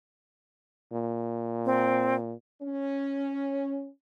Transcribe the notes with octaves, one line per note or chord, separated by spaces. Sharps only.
A#2
C4
C#4